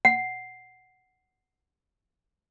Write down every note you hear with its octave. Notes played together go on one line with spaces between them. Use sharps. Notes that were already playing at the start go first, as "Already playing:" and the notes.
F#5 C7